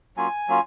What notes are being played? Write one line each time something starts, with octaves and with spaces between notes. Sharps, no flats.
F#3 A#3 C#4 F4 G#5
F#3 A#3 C#4 F4